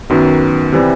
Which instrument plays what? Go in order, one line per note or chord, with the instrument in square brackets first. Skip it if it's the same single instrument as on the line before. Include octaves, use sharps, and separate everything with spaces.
[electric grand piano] F#2 D#3 F#3 B3
C3 E3 G3